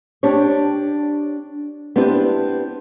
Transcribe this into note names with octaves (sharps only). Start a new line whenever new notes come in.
D4 G4 C5 C#5
B3 C4 D4 E4 G4 B4